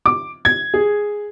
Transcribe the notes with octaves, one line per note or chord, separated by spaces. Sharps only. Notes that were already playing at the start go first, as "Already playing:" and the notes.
D6
G#6
G#4